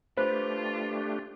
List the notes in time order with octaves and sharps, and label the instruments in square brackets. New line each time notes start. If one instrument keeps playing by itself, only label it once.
[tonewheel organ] A3 D4 G4 [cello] F4 [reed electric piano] B4 [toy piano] C5